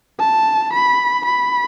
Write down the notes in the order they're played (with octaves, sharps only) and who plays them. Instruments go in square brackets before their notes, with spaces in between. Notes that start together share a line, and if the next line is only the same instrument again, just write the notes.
[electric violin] A5
B5
B5